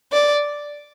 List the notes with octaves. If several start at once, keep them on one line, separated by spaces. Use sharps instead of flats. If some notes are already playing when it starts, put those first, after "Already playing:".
D5